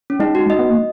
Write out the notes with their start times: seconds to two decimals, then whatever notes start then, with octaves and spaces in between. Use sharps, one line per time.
0.10 C#4
0.20 G#3 D#4
0.35 F#4
0.50 D#5
0.59 B3
0.69 A#3